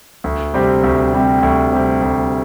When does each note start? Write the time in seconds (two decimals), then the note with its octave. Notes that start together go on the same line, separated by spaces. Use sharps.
0.24 D2
0.54 C3 G3 C4 G4
0.84 D2
1.13 C3 G3 C4 G4
1.43 D2
1.72 C3 G3 C4 G4
2.02 D2